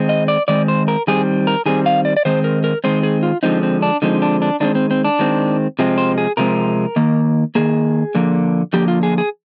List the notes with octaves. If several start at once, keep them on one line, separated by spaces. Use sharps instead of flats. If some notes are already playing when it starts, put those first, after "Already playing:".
Already playing: D#3 G#3 C4
D#5
D5
D#3 G#3 C4 D5
C5
A#4
D#3 G3 C4 G#4
A#4
D#3 G3 C4 G#4
F5
D5
D5
D#3 G#3 C4 C5
A#4
A#4
D#3 G#3 C4 C5
G#4
F4
D3 F3 G#3 C4 D#4
C4
D4
D3 F3 G#3 C4 D#4
D4
D4
D#3 G#3 C4 D4
C4
C4
D4
D#3 G#3 C4
C3 F3 G#3 C4
C5
G#4
C3 F3 G#3 C4 A#4
D#3 A#3
D#3 A#3 G#4
D3 F3 A#3
D3 F3 A#3 G4
F4
G#4
G#4